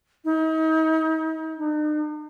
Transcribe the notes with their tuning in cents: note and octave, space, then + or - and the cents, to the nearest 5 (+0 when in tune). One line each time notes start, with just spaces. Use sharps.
D#4 +40
D#4 -45